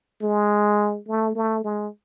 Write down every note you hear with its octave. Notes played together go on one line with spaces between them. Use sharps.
G#3
A3
A3
G#3